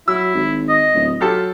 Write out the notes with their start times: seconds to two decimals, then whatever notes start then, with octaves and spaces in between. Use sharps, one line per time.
0.08 F#3 E4 E6
0.35 G#1
0.69 D#5
0.95 D1
1.21 F#3 F4 G4 A4 A5